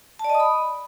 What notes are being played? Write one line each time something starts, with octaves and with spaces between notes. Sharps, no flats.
A5
D5
D#5
D#6
B5